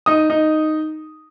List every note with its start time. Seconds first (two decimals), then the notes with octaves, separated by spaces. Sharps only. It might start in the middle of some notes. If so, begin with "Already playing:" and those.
0.06 D#4 D#6
0.30 D#4